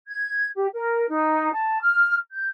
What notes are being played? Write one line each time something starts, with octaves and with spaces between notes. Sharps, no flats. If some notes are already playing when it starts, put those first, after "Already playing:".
G#6
G4
A#4
D#4
A5
F6
G6